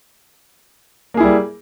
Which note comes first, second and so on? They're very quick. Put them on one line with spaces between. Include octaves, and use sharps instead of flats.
A#3 G#4 E4 G3